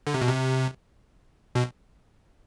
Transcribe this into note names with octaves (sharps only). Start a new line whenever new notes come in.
D3
C3
B2
C3
B2